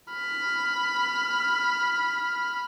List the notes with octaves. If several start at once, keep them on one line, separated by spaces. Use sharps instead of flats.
B5 F6